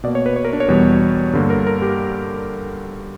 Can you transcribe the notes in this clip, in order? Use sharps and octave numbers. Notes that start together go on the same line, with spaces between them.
B2 A#3 D5
C#5
B4
C#5
A#4
D4
C#5
E2 B2 G3
G2 D3 A#3
A#4
A#4
G4